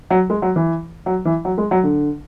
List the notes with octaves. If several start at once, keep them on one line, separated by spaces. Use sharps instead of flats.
F#3
G#3
F#3
E3
F#3
E3
F#3
G#3
F#3
D3